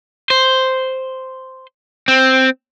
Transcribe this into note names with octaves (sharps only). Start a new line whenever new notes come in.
C5
C4